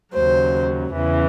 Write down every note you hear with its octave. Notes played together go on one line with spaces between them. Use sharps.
D#2 C#3 F#3 C5
E2 C#3 E3